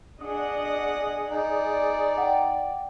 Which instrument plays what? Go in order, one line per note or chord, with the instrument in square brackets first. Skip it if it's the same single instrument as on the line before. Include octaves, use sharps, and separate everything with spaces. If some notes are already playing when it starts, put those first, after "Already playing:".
[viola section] D4 D#5 F#5 [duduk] G#4 [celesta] D#6
[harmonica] D#4 [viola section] D5
[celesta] F#5 G5